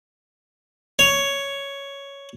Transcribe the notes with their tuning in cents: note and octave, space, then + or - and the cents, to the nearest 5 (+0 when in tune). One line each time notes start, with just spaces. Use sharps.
C#5 +5